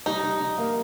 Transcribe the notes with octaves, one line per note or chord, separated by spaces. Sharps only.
G3 D#4
G3
G3
A#3